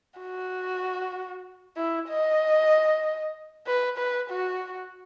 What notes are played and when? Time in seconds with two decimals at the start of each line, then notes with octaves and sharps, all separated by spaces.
0.20 F#4
1.77 E4
2.09 D#5
3.67 B4
3.98 B4
4.30 F#4